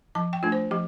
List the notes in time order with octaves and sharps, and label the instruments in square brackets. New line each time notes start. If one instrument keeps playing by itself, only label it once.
[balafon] F3 A5
G5
A3 D4 F4
C5
F3 G4